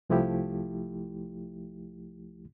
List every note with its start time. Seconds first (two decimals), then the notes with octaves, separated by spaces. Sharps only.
0.10 C2 F3 A3 E4 G4